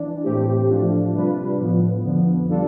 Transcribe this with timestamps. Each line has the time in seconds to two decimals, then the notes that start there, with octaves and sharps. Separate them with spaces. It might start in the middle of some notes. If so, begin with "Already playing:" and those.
Already playing: E3 D4
0.23 A2 E3 A3 C4 G4
0.69 A2 F3 A3 D4 F4
1.14 C3 G3 D4 F4 B4
1.59 A2 F3 B3
2.04 F2 D3 F3 B3
2.49 G3 D4 F4 A4